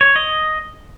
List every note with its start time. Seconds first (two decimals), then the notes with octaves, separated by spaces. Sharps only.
0.01 C#5
0.16 D#5